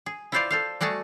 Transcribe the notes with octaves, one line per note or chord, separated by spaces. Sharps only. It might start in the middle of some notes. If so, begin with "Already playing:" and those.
G#4
E4 F4 B4 C5 D5 F5
A4 C5 F5
G3 A3 F#4 G#4 A5